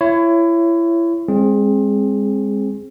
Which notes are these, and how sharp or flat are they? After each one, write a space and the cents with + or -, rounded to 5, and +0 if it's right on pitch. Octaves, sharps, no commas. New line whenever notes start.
E4 +30 C#5 +0
G#3 -30 C4 +20 G#4 +5